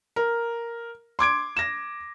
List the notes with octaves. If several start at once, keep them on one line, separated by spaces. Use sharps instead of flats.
A#4
C6 D6 G#6 D7
A#6 E7